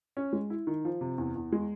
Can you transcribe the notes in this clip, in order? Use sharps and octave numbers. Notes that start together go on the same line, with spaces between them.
C#4
G#3
E4
D#3
F3
C3
E2
E2
G#3